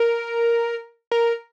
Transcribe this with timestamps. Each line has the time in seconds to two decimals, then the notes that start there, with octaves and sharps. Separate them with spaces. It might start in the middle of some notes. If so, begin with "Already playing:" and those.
Already playing: A#4
1.11 A#4